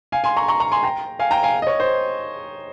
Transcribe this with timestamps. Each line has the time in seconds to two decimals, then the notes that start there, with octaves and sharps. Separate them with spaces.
0.12 F5 G#5
0.24 G#5 C6
0.37 A#5 C#6
0.48 A#5 C#6
0.60 A#5 C#6
0.72 G#5 C6
0.83 G5 A#5
1.19 F5 G#5
1.31 G5 A#5
1.43 F5 G#5
1.62 D#5
1.67 C#5
1.80 C5